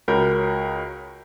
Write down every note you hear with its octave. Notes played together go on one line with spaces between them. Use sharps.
C#2 F#4 A#4 C#5 B5 G6